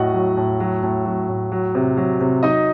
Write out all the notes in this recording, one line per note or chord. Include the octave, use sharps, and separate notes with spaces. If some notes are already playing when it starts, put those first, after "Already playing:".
Already playing: A2 F#3 F#4 D#5 F#5
F#3
A2
F#3
A2
F#3
A2
F#3
C3
F#3
C3
F#3 D#4 D#5